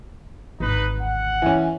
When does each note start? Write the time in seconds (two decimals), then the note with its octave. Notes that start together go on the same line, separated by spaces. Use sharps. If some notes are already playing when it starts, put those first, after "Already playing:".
0.60 G#1 D2 D#4 B4
1.00 F#5
1.42 E3 C#4